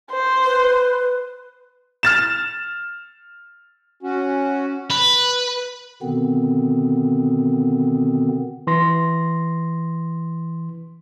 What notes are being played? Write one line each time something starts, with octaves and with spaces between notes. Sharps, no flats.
C5
B4
F6 A6 E7
C#4 F#4
B4
B2 D3 D#3 B3 C4
E3 C6 A#6